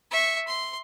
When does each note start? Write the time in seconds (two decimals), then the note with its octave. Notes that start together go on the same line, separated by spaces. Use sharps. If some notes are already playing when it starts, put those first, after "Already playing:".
0.11 E5 C#6
0.47 C6